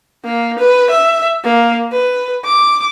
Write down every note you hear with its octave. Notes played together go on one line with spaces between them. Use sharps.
A#3
B4
E5
A#3
B4
D6